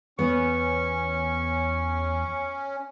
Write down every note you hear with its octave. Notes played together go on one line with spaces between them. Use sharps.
E2 B3 C#4 C#6